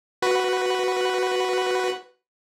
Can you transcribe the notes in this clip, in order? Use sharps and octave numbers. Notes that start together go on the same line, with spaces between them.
F#4 B4